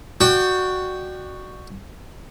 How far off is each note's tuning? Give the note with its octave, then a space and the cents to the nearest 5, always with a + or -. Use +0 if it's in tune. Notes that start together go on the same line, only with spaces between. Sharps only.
F#4 +0 D5 +30 G5 -5